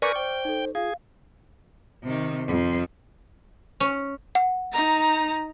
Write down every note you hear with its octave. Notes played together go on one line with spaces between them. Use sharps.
A#4 B4 D5 G#5 C#6 F6 G6
C5 G5
D#4 A4
F4 G#4 F5
C3 D#3
F2
C#4
F#5
D#4 A#5